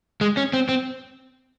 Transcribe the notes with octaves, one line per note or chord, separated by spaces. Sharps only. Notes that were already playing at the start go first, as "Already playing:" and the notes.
G#3
C#4
C4
C4